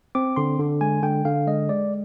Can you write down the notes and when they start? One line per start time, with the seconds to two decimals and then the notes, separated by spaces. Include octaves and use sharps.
0.15 C4 D6
0.36 D3 C6
0.59 D3
0.81 G#3 G#5
1.03 D3 G5
1.25 D3 F5
1.47 G#3 D#5
1.69 G#3 D5